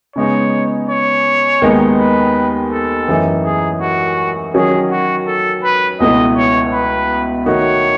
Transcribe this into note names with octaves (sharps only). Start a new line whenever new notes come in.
C#3 G#3 B3 D#4 C#5
C#5
D#2 D#3 G#3 B3 D#4
B4
A4
F#2 E3 A3 D#4
G#4
F#4
D#3 F#3 C#4 G#4
F#4
A4
B4
C#2 B2 A3 E4 D#5
C#5
B4
D#3 A3 D#4 F#4 C#5